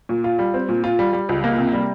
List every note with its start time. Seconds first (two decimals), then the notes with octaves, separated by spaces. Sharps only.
0.09 A#2
0.24 F4
0.39 G3
0.54 C4
0.69 A#2
0.84 F4
0.99 G3
1.13 G3
1.29 C#2
1.44 A#3
1.58 C3
1.73 G3